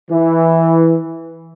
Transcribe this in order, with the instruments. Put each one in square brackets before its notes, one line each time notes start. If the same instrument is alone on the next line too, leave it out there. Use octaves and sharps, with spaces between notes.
[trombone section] E3